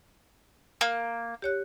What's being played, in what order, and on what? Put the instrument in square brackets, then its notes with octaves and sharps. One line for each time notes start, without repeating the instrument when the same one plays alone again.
[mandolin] A#3
[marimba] G4 C#5 F#6